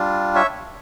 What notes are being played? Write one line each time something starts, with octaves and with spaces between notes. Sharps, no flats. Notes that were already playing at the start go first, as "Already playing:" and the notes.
Already playing: G3 D4 F4
C#5 E5